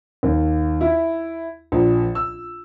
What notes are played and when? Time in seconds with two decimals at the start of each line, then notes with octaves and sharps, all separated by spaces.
0.23 D#2
0.81 E4
1.72 A#1
2.15 E6